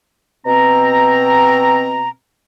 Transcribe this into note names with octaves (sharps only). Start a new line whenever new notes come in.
B2 C4 A#5